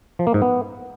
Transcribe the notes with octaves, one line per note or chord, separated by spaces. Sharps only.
F3
A#3
G#2
B3